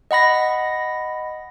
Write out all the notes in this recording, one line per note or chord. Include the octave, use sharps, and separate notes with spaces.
D#5 F#5 B5 A#6